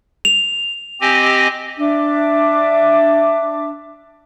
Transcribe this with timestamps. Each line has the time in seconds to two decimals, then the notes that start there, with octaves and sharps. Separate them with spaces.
0.25 F7
1.01 C4 G4 D#5 G#5
1.77 D4 E5 D6